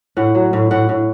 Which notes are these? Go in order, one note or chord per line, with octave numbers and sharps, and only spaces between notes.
A2 F#5
F#3
A2
A2 F#5
A2